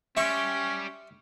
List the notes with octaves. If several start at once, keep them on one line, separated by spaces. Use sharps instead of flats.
G3 C#4 G4 E5 C6 C#6